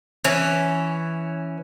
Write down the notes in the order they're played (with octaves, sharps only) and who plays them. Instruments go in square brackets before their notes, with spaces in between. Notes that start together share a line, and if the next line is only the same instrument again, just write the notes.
[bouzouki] E3 C#4